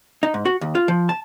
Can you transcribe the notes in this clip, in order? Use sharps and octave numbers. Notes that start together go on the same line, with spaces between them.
D#4
G#2
F#4
D#2
F4
F3
A5